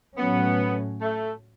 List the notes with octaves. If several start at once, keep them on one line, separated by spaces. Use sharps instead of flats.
A2 F#3 A3 B3 C#4
A3